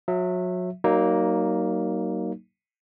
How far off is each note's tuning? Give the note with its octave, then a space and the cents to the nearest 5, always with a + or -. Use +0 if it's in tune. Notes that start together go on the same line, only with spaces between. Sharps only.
F#3 -30 E5 +0
F#3 +35 A#3 +0 D#4 +0